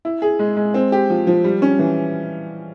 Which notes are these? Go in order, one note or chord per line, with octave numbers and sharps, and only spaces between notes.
E4
G#4
G#3
G#3
C4
G4
F3
F3
G3
C#4
E3